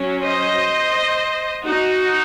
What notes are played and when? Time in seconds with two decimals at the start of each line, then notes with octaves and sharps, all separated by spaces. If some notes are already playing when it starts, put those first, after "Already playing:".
Already playing: F#3 C#4
0.25 C5 D#5
1.64 D#4 F#4